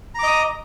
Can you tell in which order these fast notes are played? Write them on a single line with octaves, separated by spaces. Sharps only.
A#5 D6 D#5 D#6